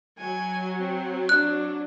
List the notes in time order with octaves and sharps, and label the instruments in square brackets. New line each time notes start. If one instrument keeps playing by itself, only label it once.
[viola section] F#3 [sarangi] G#5
[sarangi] C4
[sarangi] D4 [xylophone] F#6